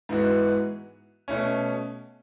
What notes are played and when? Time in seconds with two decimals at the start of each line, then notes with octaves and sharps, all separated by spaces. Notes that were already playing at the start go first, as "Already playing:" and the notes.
0.09 G#2 E3 B3 F#4
1.28 B2 A3 C#4